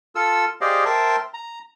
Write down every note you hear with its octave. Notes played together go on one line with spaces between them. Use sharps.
F4 A4 E6
G4 G#4 C5 D5 D#5 F5
A#4 C5 E5 G5 A5 C6
A#5